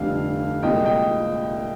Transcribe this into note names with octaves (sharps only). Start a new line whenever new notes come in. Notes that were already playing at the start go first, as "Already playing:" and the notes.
Already playing: F1 F2 D3 G3 D4 F5
C2 A#2 G#3 D#5 G5
D#5 G5